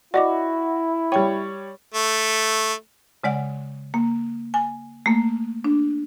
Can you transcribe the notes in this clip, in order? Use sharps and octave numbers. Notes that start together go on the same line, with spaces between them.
E4 F#4 D5 D#5 D6
G3 C#5 G5 C#6
A3
C#3 G#3 D5 F#5
A#3
G#5
A3 A#3
D4